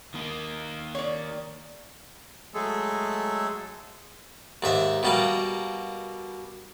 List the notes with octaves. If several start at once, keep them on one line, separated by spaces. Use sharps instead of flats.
D#3 A#3
C#5 D5
F#3 G#3 A3 G#4 A4
D#2 G#2 E5
B2 G3 A#3